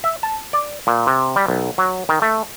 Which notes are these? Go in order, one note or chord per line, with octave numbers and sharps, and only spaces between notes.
E5
A5
D5
A#2
C3
G3
B1
F#3
D#3
A3